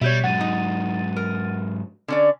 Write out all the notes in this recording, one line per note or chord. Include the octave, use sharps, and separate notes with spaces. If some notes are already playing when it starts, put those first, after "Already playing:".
B2 G3 C#5 E5 G6
G#2 F#3 F#5 A6 D#7
D#4
A#4
D3 C#4 D5